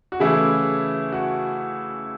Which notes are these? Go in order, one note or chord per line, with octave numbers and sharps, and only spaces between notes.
F#4
C#3 E3 A3 E4 G#4
F#4